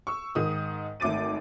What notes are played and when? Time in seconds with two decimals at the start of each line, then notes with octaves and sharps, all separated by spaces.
0.07 C#6 E6
0.35 G#2 D#3 D#6
1.00 G#1 A3 D6 A6 D#7